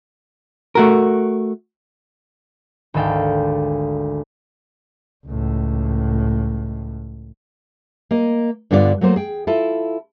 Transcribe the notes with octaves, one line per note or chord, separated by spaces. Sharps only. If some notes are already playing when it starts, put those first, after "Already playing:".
A3 F#4 A#4
G#1 D2 G#3 A4 F5 G5
C#2 A2
A#3 D#5
G2 D3 B3 F4 G#4 D5
F#3 A3 A#3 C5
G#4 G5
E4 F4 A4